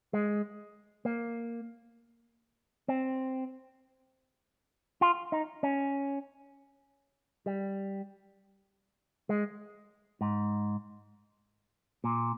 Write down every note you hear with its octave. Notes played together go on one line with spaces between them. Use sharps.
G#3
A#3
C4
F4
D#4
C#4
G3
G#3
G#2
A#2